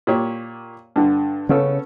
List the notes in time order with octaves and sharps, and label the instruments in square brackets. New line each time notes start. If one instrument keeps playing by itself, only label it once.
[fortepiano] A#2 G4 C#5
G2 D3
[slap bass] C#3 [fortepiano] B3 C#4 A4